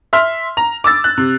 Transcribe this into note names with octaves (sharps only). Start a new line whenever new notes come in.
E5 C6 F6
A#5
D6 E6 A6
F#6
C3